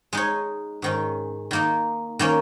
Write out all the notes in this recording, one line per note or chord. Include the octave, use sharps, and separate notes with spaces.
G#3 D#4 C#5
G#2 D#3 C#4
D#3 A#3 D#4
D#3 A#3 C#4